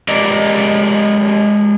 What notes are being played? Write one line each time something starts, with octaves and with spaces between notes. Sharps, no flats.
G#3 G4 A#4 D5 D#5